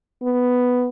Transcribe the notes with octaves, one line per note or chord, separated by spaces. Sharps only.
B3